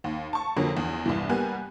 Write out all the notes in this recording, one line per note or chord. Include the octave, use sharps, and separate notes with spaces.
D#2
A5 C#6
F2 D3 F#3 A#3
E2
C2 G2 E3
G3 A#3 B3 G#5 F#6